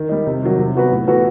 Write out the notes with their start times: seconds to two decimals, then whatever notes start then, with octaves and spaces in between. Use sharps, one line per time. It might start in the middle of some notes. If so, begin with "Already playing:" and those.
Already playing: D#3
0.09 G3 D#4
0.27 C3
0.43 D#3 F#3
0.59 C3
0.75 F#3 B3 F#4 B4
0.92 A2
1.07 E3 B3 F#4 A4